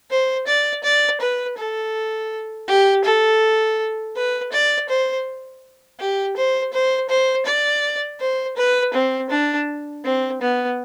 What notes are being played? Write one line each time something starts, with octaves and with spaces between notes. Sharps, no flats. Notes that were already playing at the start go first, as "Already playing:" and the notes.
C5
D5
D5
B4
A4
G4
A4
B4
D5
C5
G4
C5
C5
C5
D5
C5
B4
C4
D4
C4
B3